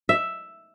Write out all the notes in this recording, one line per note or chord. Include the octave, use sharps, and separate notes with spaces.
E5